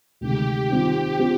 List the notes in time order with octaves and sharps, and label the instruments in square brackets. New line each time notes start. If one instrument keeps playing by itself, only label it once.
[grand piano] D2 C3 D#3 G#3 [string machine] G4
[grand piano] D#3 G3 C4 F4
F3 C4 G4 C5